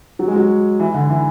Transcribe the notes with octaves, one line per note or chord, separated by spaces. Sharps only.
F#3
G#3
F#3
E3
D3
E3